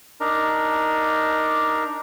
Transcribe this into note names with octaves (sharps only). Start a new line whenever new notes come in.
D4 D#4 A#4